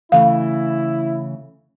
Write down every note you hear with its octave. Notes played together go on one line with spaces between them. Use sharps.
C#3 E3 A3 E4 F5